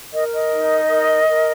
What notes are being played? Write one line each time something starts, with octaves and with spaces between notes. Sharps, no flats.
A#4 D#5
D#5
D#4
A#4
A#4